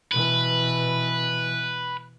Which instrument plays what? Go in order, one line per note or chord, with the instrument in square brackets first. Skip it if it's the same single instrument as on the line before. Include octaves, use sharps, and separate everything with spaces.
[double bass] B2 E3 [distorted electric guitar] B4